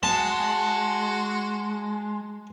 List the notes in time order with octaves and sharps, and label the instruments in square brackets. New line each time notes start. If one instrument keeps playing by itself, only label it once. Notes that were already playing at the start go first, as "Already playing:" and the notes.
[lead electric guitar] G#3 [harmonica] F#4 [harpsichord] A5